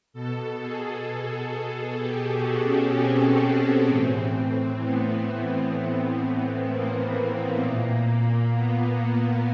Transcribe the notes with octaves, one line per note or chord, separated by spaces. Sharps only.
B2 A4
G#4
G4
F#4
C#4
C4
A2 E3
B3
A#3
A#2
B3